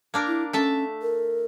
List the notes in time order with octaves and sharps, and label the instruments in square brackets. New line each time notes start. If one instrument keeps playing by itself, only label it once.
[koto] A#3 D4 A#4
[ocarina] E4
[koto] A3 E5 A5 [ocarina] C#4
[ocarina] A#4